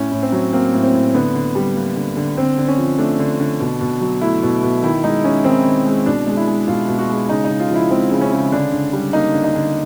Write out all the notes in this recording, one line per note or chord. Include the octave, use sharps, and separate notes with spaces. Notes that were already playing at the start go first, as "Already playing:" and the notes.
Already playing: A2 C#4
A2
C4
F#3
A#3 C4
A2
C4
A2
D3 B3
D3
G3
A#3
D3
D3
D3 C4
D3
C#4
F3
A3 D4
D3
D3
B2
B2
F#3
A3 E4
B2
B2
D#3 E4
G#3 D#4
G#3 C#4
D#3 C4
D#3
G#3
B2 D4
G#3
E4
G#3
B2 F4
B2
F#4
G#3
C#3 D#4
C#3 D#4
F4
F3
E4
G#3 C4
C#3
C#4
C#3
D3 D4
D3
G3
A#3 D#4
D3
D#4
D3